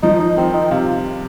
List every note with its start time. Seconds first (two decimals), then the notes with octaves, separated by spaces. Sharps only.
0.03 F3 D#4
0.20 D#4
0.37 D#3 C4
0.54 D#4
0.71 C3 F4